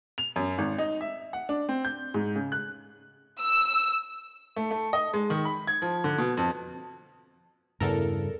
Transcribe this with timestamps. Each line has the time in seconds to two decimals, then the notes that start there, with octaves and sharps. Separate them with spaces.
0.18 F7
0.36 F#2
0.58 G#1
0.78 D#4
1.01 E5
1.33 F#5
1.49 D4
1.69 C4
1.85 G6
2.14 G#2
2.36 C#3
2.52 F#6
3.41 E6
4.56 A3
4.71 A3
4.93 D#5
5.14 G#3
5.30 D#3
5.45 B5
5.67 G#6
5.82 F3
6.04 D3
6.18 B2
6.37 F2
7.80 E2 G2 C#3 A4 A#4